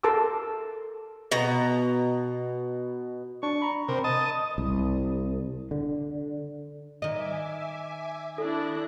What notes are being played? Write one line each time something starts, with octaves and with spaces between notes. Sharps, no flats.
A4 A#4 A5 C6 D6 E6
B2 A#5
D4 C#6
A#5 B5
C3 A#4
D#5 A5
C2
D3
D#3 D#5 E5 G#5 D6
D4 E4 A4 F#6 A#6